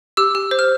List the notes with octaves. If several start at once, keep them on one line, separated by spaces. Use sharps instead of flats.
G4 E6
G4
C5
F6